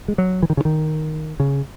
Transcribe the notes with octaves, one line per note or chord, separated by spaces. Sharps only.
G#3
F#3
E3
D#3
C#3
D#3
C#3